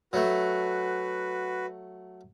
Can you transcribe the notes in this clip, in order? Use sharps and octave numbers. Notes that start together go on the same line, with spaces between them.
F#3 A3 F#4 B4